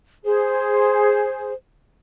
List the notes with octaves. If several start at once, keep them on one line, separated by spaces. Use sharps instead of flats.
G#4 C5